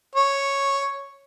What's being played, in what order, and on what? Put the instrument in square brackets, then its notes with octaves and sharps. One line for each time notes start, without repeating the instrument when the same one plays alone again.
[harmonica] C#5